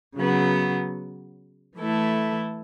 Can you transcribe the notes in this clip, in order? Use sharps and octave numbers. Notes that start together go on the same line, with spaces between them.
C#3 F#3 B3
E3 A3 E4 A4